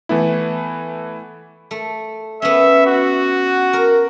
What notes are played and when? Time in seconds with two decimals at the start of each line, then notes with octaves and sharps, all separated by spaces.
0.09 E3 A3 B3 E4
1.71 A3
2.42 B3 C#4 E5
2.87 F#4
3.73 A#4